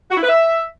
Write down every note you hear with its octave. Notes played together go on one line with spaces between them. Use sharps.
F#4
E4
B4
E5